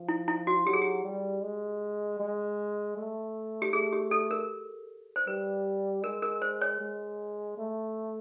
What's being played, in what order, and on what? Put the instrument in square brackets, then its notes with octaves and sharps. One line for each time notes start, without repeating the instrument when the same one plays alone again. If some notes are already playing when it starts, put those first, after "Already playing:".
Already playing: [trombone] F3
[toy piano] E4
E4
F#4
[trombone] F#3 [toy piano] G4
[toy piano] G#4
G4
[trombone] G3
G#3
G#3
A3
[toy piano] G4
[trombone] A3 [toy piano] G#4
[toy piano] G4
A4
A#4
C5
[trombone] G3 [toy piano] B4
[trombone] G#3 [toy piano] A#4
[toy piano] A#4
C5
C#5
[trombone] G#3
A3